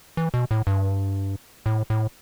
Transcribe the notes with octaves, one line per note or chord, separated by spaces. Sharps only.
E3
B2
A2
G2
A2
A2